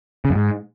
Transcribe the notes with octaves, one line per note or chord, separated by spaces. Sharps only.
C#3
F#2
G#2